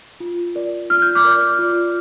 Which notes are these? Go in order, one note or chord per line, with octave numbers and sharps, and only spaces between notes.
F4
A#4 D5
F4 F6
G6
D6 F6
A#4 D5
F4